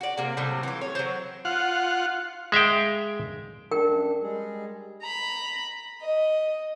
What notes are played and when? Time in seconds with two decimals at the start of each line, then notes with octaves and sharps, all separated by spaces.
0.01 F#4 D5
0.18 C3 A#3
0.37 A2 C3 F#3 G3
0.63 E3 F4
0.81 C#5
0.95 F#3 C4
1.45 F4 F#5
2.52 G#3 E5 F5 G5
3.71 F#2 D4 A#4 G5
4.21 G3 G#3 G#4
5.02 A#5 B5
6.01 D#5